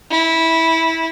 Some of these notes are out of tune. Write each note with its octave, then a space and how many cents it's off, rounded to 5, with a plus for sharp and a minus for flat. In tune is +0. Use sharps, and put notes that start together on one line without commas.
E4 -15